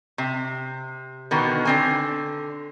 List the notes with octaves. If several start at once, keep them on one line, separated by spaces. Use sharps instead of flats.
C3
B2 D3 D#3 B3
D3 C4 G#5